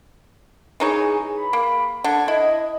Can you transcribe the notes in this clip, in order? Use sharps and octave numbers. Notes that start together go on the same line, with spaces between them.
E3 D#4 G#4 C#5
B5
A#3
D3 G#6
E4 D#5